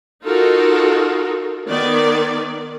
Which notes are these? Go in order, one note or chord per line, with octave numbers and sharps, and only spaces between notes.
D#4 F4 F#4 A4 A#4
D#3 B3 D5